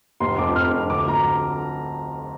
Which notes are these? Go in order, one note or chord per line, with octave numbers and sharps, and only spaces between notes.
F1 C6
F2 D6
F2 F6
F2
D2 D6
D2 A#5